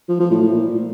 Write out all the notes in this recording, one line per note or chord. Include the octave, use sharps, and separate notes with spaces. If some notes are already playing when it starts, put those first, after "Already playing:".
F3
F3
A2
A2
A#2